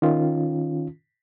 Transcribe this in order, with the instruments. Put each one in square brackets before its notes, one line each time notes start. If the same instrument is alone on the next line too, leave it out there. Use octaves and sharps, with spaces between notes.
[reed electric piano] D#3 C#4 F4